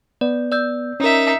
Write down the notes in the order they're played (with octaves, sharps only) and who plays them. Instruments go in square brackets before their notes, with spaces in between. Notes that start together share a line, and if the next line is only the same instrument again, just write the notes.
[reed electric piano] B3 [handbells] D5
[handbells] D5 E6 G6
[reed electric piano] C#4 A#4 [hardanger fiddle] D#4 E5